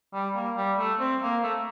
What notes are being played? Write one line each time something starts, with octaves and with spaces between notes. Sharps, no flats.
G3
A#3
G3
A3
C4
A#3
A3